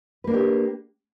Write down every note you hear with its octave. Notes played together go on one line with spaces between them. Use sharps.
A#3 D4 G4 B4